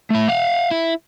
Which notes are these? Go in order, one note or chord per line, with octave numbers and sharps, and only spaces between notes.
A3 E4
F5 F#5
E4